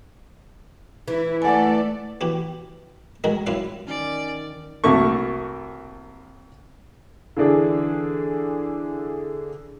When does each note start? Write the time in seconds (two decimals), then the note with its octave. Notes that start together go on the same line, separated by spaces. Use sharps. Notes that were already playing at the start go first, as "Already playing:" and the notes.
1.08 E3 E4
1.42 A3 A4 D5 F#5 G#5
2.21 E3 F#4 G4
3.24 D#3 G#3 F#4 A#4
3.47 F#2 E4 F4 F5
3.88 D#3 C#4 D5
4.84 C2 F#3 A3 A#3 C#6
7.37 D3 E3 D4 G#4